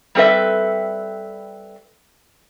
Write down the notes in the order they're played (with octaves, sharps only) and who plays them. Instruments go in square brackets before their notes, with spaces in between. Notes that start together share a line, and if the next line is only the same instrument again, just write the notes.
[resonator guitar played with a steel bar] G3 C4 A4 B4 E5